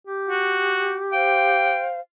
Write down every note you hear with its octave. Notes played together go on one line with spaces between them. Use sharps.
G4
F#4
C5 F5 G5